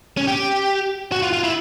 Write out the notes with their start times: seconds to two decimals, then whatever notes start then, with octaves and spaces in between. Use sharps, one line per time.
0.17 C#4
0.27 G4
1.12 F#4
1.22 F4
1.33 F4
1.44 E4